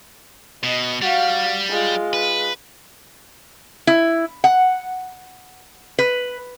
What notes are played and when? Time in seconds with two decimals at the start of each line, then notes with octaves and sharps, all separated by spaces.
0.63 B2 D#5
1.02 G3 F#4 F5
1.69 G#3 F4
2.13 B4
3.87 E4
4.44 F#5
5.99 B4